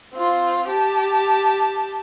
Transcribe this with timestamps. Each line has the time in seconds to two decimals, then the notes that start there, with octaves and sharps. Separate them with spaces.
0.14 C4 F4
0.69 G4 A5